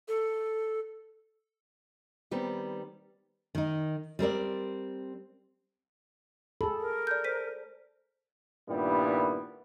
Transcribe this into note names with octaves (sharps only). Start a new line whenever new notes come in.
A4
D#3 G3 B3 C4
D#3 D#4
G3 C4 A#4 D5
G#4 A4 B5
A#4
D5 G6
C5 B6 D#7
G2 A#2 D#3 G3 B3 E4